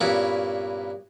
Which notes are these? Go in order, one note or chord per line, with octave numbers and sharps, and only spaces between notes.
G2 A#2 B3 C#4 E4 F#4